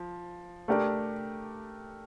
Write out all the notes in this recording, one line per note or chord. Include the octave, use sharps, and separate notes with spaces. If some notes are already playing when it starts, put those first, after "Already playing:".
Already playing: F3
A3 D4 G4 A#4 D5